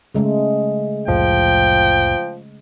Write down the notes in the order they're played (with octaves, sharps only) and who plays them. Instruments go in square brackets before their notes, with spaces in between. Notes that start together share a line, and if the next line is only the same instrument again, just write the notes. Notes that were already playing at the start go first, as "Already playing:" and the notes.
[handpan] C#3 G#3 A3
[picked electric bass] C2 F2 A2 [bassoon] F3 [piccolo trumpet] G5